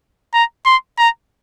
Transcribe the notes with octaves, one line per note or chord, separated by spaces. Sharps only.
A#5
C6
A#5